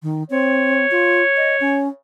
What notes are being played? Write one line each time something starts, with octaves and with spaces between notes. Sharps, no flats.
D#3
C4 C#5
F4
D#5
C#4